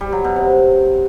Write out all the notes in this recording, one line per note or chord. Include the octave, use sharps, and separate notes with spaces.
G3
F#3
B2
C3